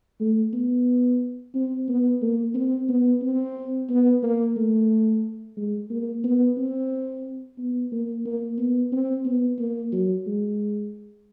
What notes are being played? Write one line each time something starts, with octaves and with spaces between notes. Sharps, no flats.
A3
B3
C4
B3
A#3
C4
B3
C4
B3
A#3
A3
G#3
A#3
B3
C4
B3
A#3
A#3
B3
C4
B3
A#3
F#3
G#3